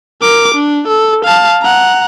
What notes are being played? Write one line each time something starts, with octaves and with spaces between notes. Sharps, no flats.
A#4 D6
D4
A4
F5 A5
F#5 A#5